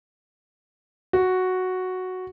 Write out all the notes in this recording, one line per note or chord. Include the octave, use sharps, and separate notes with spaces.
F#4